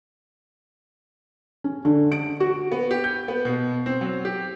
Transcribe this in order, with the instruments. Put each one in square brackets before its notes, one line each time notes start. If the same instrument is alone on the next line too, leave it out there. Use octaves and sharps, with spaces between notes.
[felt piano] C#4
D3
D7
F#4
[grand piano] B3
G4
G6
B3
B2
C4
F#3
G4